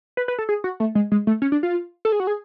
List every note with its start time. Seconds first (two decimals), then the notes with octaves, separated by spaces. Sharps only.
0.17 B4
0.28 B4
0.38 A4
0.49 G#4
0.64 F#4
0.80 A3
0.95 G#3
1.12 G#3
1.27 A3
1.42 C#4
1.52 D4
1.63 F4
2.05 A4
2.12 G#4
2.20 F#4
2.27 G#4